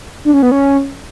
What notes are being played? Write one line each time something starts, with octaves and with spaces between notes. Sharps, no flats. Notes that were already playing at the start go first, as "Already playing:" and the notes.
D4
C#4
B3
C#4